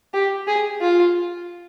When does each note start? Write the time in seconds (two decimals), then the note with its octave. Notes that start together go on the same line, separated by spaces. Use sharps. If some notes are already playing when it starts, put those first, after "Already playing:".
0.14 G4
0.47 G#4
0.81 F4